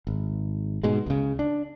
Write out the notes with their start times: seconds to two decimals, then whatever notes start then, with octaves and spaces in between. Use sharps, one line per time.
0.07 G#1
0.83 G#2 B2 G#3
1.06 C#2 C#3
1.39 D4